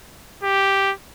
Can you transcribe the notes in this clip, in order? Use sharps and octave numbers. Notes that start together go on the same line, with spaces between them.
G4